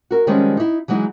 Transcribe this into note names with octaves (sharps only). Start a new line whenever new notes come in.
F#4 A#4
D#3 F3 G3 G#3 C4 C#4
D#4 E4
E3 F#3 G#3 D#4 E4 G#4